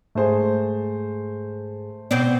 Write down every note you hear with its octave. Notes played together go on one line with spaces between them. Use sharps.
G#2 A3 G#4 C5
B2 B3 C4 D5